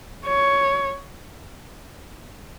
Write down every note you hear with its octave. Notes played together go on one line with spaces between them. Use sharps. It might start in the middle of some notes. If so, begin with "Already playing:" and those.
C#5